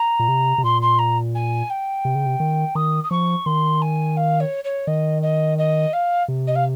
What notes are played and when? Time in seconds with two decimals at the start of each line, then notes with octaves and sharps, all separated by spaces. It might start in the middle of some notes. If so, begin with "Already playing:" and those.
Already playing: A#5
0.19 A#2
0.28 C3
0.58 C3
0.64 A#2 C6
0.81 C6
0.98 A#5
1.35 G#5
1.69 G5
2.05 C3
2.15 C#3
2.26 C3
2.40 D#3
2.75 D#3 D#6
3.03 D#6
3.11 F3 C#6
3.46 D#3 C6
3.81 G#5
4.16 F5
4.40 C#5
4.64 C#5
4.87 D#3 D#5
5.22 D#5
5.58 D#5
5.93 F5
6.28 C3
6.47 D#5
6.55 F5